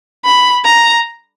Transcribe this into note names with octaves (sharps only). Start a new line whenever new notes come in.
B5
A#5